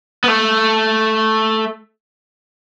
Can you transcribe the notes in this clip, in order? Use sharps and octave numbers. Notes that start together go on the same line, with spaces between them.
B3
A3